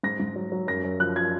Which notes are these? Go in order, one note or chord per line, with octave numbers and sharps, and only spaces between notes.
G#2 A#6
G#2
F#3
F#3
F#2 A#6
F#2
F3 F#6
F3 G#6